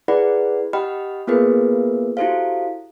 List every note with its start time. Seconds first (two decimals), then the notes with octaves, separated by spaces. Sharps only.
0.08 E4 G#4 B4 D5 F#5 B5
0.73 G4 D#5 F#5 G5 B5 F6
1.27 A#3 B3 F4 G#4 A#4 B4
2.17 E4 F#4 G4 A4 C5 F5